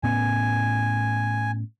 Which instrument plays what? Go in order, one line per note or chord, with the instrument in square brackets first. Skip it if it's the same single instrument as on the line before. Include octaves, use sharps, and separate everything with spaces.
[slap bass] A2 B3 C#4 [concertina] G#5